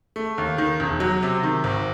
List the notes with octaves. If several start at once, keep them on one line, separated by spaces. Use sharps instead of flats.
A3
D#2
D#3
E1
F#3
C3
D#3
G#1